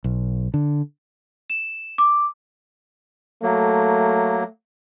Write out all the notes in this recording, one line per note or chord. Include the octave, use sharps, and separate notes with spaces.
B1
D3
E7
D6
F#3 A3 A#3